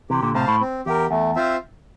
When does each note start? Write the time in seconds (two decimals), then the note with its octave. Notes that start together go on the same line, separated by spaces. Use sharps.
0.10 C3 E3 G4
0.23 A#2 D3
0.35 A2 C3 C5 F5 A5
0.48 A2
0.61 C4
0.86 E2 G4 A#4
1.10 E2 A3
1.36 C4 F4 C5 E5